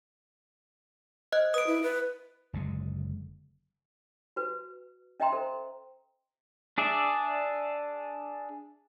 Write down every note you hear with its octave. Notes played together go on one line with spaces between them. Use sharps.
C5 D#5 F#6
B4 D#6 D7
E4
B4
F#1 D3 G#3
F#4 B4
C#4 D#5 E5 G5 A#5 C6
A4 C5
D4 G#4 D5 E5